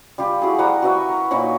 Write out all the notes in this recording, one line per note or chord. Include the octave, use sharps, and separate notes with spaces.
G3 F4 G4
E4 F#4 G#4
G3 F#5 A#5 D6
F#4 B4 E5
A#4
A#2 D#4 C#5 B5